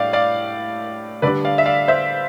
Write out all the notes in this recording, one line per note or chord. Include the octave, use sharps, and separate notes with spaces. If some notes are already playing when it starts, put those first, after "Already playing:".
Already playing: A2 G3 D4 D5 F5
D5 F5
D3 G3 D4 B4 D5
D5 F5
E5
D5 F5
C5 E5